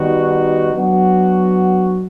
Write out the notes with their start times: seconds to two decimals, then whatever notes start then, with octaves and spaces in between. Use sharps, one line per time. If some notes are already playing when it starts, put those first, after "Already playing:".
Already playing: D#3 G3 B3 D#4 F#4
0.72 F#3 B3 D4 F#4